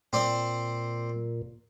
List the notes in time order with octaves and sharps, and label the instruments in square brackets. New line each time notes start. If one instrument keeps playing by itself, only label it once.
[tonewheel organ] A#2 [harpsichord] C4 C5 D5